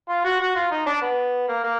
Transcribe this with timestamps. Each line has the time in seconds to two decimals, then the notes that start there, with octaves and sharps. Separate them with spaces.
0.09 F4
0.24 F#4
0.40 F#4
0.56 F4
0.71 D#4
0.86 D4
1.01 B3
1.48 A#3
1.64 A#3